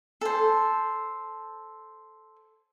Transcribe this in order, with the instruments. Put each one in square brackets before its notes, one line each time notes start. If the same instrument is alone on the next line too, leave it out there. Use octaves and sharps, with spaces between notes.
[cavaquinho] A4 C5